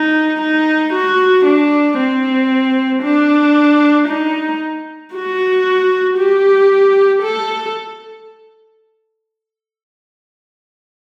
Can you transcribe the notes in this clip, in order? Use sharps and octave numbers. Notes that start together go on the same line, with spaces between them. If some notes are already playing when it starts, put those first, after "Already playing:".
Already playing: D#4
D#4
F#4
D4
C4
D4
D#4
F#4
G4
A4